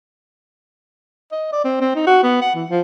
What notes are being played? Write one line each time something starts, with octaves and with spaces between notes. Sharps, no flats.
D#5
D5
C4
C4
D#4
F#4
B3
F#5
E3
F3